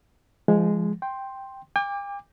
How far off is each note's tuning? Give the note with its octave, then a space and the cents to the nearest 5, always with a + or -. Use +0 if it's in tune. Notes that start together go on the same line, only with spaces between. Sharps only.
F3 -25 G#3 -5
G5 +0 C6 +10
G5 +45 D6 +0